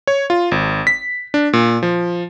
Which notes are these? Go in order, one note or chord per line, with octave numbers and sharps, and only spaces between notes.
C#5
F4
G#1
B6
D4
A#2
F3